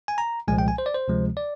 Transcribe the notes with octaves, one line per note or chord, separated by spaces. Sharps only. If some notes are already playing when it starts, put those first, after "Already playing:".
G#5
A#5
C2 A#2 F3 G#3 G#5
G5
G#5
C5
D5
C5
D2 C3 F3 G#3
D5